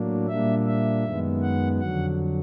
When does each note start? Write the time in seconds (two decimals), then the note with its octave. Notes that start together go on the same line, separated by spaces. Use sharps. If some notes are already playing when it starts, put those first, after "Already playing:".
Already playing: A2 F#3 A#3 D4
0.28 A#2 G3 A#3 D4 E5
0.66 E5
1.04 F#2 D#3 G#3 B3
1.42 F#5
1.79 F2 D3 F#3 F#5